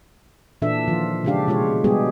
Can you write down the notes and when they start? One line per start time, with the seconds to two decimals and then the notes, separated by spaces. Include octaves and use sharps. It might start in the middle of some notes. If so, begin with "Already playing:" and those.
0.62 A#2 E3 D4 A4 E5
0.88 D#3 F3 F4
1.24 C#3 G#3 D4 G4 F5
1.48 B2 G#3 F4 G4 C#5
1.84 G3 G#3 B3 G4 G#4